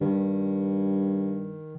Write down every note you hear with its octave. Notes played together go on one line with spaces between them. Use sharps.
G2 D#3